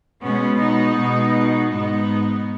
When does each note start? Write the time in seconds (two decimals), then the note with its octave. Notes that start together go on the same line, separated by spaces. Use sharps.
0.22 B2 G#3 B3 C#4
0.59 D#4
0.98 B2 G#3 B3
1.73 G#2 G#3 B3 D#4